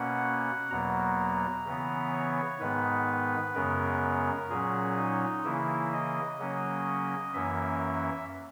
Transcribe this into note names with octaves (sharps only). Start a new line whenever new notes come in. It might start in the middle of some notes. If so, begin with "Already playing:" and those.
Already playing: B2 A#3 C#4 F#5
E2 B2 F#3 A#3 A#5
C#3 E3 B3
C#5
G#2 D#3 G#3 B3 B4
F#2 C#3 G#3 B3 A#4
A#2 F#3 C#4 G#4
D#4
C#3 E3 A#3 E4
D#5
C#3 F#3 A#3 C#4
F#2 E3 A#3 C#4 E5